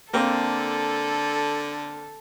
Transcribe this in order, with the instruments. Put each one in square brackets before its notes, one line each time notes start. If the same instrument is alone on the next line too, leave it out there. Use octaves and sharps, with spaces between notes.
[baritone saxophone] D3 [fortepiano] A#3 C4 [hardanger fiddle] A4